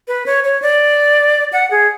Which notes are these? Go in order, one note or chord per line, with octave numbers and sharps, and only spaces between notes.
B4
C#5
C#5
D5
F#5
G#4